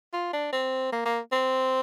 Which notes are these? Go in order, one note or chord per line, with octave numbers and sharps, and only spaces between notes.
F4
D4
C4
A#3
A#3
C4